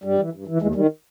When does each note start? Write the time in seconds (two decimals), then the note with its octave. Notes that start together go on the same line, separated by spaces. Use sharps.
0.04 G2 G3
0.18 E3
0.33 G2
0.47 E3
0.61 D#2 E3 G#3
0.75 D#3 G3